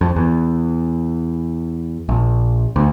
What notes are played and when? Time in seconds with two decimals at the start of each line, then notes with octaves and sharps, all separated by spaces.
0.01 F2
0.16 E2
2.09 A#1
2.76 D2